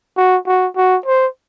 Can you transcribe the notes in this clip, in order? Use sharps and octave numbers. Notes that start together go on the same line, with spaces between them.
F#4
F#4
F#4
C5